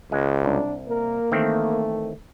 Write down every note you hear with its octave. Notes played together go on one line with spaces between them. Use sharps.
C#2 G#3
C2 D4
A#3 A#4
D#3 E3 A3 C4